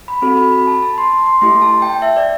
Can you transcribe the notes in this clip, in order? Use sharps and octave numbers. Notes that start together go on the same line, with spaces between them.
B5
C4 F#4 A4 B5
B5
B5
A5
A5
C6
C6
A3 E4 G4 C6
A5
G5
E5
D5